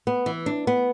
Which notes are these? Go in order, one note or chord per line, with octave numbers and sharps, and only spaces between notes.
B3
E3
D4
B3